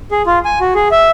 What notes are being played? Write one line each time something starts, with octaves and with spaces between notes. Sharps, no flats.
G#4
F4
G#5
F#4
G#4
E5